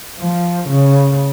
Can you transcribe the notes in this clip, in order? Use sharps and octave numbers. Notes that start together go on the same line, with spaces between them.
F3
C#3